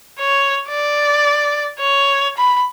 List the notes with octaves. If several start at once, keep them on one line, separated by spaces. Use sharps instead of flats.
C#5
D5
C#5
B5